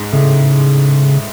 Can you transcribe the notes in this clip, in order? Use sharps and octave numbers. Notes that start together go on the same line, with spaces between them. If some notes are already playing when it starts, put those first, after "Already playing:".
Already playing: G#2
A2 C#3